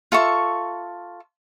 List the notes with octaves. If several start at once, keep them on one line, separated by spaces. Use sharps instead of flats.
F4 A4 E5 C#6